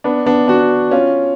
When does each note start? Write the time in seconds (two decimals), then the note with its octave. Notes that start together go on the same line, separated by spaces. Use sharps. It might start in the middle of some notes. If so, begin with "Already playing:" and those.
0.04 B3 D4
0.26 B3 D4
0.48 D4 F#4
0.91 C#4 F4